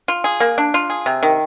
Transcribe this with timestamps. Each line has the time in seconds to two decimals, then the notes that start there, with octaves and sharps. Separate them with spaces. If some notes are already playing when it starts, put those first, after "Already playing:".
0.08 F4
0.24 G#4
0.40 A#3
0.58 D4
0.74 F4
0.90 G#4
1.06 C3
1.23 D#3